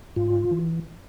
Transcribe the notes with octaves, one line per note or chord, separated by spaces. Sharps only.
G#2 F4
E3